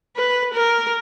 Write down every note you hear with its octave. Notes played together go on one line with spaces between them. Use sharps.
B4
A#4